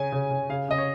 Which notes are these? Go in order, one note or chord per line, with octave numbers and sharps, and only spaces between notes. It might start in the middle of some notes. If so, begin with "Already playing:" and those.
Already playing: C#3 C#4 G#5
C#3
C#3
C#3 F5
C#3 D#5
C#5